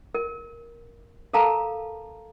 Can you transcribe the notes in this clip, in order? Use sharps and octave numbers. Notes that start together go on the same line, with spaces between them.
A#4
A4 A#4 F5 A5 A#5